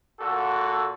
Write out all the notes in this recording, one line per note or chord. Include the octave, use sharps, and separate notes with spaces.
A#2 F#4 A4